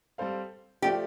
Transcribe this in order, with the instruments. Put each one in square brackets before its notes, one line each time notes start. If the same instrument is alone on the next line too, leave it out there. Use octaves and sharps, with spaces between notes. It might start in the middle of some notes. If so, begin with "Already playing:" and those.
[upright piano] G3 C4 A4 C5 F5
[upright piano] F3 A3 F4 D5 [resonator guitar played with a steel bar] G4